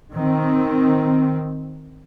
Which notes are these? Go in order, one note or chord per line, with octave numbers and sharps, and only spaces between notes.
D#3 C4